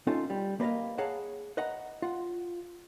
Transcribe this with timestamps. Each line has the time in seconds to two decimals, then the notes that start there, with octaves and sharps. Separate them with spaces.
0.07 C#4 D#4 F4 A4
0.30 G3
0.60 A#3 B4 D5 D#5 F5
0.98 G#4 C#5 F5 F#5 A5 A#5
1.57 B4 D#5 F#5 A#5
2.02 F4 F#5